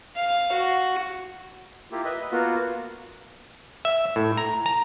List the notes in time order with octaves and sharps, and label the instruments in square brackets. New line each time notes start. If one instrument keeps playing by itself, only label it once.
[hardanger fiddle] F5
F#4
[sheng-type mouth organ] A#3 E4 F4 G4
B4 D#5 E5
A#3 B3 F4 F#4
[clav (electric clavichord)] E5
A2
A#5
A#5